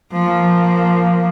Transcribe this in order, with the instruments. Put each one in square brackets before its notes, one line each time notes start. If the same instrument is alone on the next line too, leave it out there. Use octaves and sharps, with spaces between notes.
[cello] F3 A#3